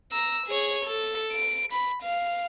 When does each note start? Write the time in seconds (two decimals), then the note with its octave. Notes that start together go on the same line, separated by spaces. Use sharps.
0.12 A#5 E6
0.47 G#4 C#5
0.85 A4
1.32 D7
1.73 B5
2.03 F5